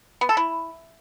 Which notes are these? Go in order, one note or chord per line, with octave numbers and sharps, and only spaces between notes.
B3
A4
E4